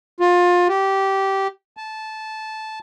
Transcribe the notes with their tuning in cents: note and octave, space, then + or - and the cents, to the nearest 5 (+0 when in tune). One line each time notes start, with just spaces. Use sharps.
F4 +25
G4 -15
A5 -15